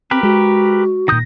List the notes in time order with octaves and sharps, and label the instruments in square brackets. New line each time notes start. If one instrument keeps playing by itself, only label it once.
[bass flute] C4 [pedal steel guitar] G4 A#4 B4
[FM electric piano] G#3 [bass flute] F#4
[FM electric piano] A#2 A#6 [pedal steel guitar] D#3 D#6 G6